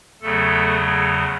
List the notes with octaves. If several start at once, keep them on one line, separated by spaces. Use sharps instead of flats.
E2 C#3 F#3 A3 A4